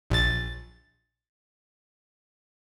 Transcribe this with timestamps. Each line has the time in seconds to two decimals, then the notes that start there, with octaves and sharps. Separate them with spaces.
0.10 A#1 A6